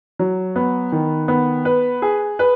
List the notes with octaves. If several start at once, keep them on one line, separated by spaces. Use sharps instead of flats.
F#3
B3
D#3
B3
B4
G#4
B4